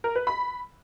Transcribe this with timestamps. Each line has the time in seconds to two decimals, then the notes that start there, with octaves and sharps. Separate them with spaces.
0.04 A#4
0.15 B4
0.27 B5